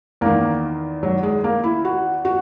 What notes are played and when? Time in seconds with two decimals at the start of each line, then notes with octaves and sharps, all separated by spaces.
0.21 E2 D#3 A#3
1.03 F#3
1.23 G#3
1.44 A#3
1.64 E4
1.85 F#4
2.25 F#4